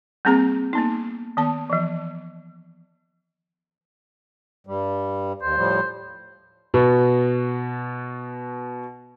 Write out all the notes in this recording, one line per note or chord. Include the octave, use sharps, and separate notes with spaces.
G3 A#3 C4 G#4 A#5
A#3 B3 D#4
D#3 B3 A5
E3 F3
G2 G3
D#2 C5
A2 F3 G3
B2 B3 F#4